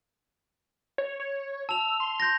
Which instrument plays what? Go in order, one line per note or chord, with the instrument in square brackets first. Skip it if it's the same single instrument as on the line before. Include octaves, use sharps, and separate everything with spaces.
[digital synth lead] C#5
C#5
[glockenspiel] A5 F7 [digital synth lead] E6
[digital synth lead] C6
[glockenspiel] G6 A#6